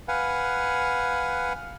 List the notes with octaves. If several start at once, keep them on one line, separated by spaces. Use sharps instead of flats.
B4 F5 F#5 G#5